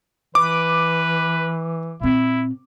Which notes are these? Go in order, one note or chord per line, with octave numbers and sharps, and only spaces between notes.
E3 B4 D6
A#2 C4 E4